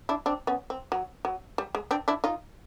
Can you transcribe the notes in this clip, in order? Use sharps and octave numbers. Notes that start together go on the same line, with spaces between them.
D4 E4
C4 D4
B3 C#4
C4
F#3
F#3
G3
G#3
C4 D4
D4 E4
D#4 F4